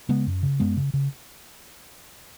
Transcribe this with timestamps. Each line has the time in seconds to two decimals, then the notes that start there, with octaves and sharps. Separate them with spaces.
0.09 C#3 G#3 B3
0.27 F#2
0.43 C#3
0.60 F#2 G#3 B3
0.77 C#3
0.94 C#3